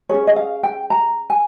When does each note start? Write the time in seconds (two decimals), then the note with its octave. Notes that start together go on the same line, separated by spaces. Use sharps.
0.09 C#4 G#4 C#5
0.27 D#5
0.36 F5
0.63 G5
0.90 A#5
1.30 G#5